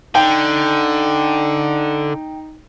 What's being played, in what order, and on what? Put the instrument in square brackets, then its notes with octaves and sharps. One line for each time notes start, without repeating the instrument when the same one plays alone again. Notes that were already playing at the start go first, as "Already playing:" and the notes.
[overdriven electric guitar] D3 [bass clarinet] D#4 [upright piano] G5